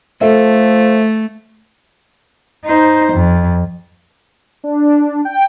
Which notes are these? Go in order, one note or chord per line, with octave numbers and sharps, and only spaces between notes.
F3 A3 A4 E5
D#4 C5
F2
D4
G5